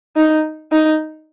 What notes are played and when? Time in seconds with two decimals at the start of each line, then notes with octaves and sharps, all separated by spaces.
0.16 D#4
0.72 D#4